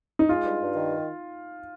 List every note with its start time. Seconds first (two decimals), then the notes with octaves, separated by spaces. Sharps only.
0.19 D#4
0.29 G#3 F4
0.44 G2
0.61 G2
0.75 D#3